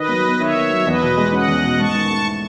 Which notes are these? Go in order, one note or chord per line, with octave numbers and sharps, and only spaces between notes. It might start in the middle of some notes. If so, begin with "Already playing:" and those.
Already playing: D#3 B4 D#5
F#3
B3
D#3 C#5 E5
D#3
F#3
E2 B4 D#5
B2
G#3
C#4 D#5 F#5
E2
B2
G#2 A5 C#6
D#3
A3
E4